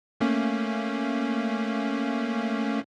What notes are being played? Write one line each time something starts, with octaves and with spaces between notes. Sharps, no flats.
A3 A#3 C#4